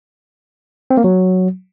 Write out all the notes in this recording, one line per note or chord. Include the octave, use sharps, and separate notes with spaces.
C4
A#3
F#3